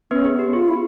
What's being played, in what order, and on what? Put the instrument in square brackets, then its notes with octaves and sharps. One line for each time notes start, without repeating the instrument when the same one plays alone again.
[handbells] B3 B4 [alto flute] C#4
[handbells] G#4
[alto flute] B3
[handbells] G4
[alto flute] F4 [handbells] G#4
[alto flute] E4